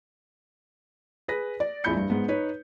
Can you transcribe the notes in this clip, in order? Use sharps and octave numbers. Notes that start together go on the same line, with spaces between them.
G#4 B4 A#6
D5
A#1 F2 E4 B5 G6 C#7
G2
G#2 B3
D#4 B4 C#5